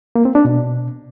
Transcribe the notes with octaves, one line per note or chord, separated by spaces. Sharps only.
A#3
C4
D4
B2